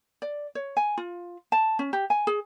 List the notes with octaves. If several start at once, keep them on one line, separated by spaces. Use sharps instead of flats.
D5
C#5
G#5
F4
A5
C#4
G4
G#5
G#4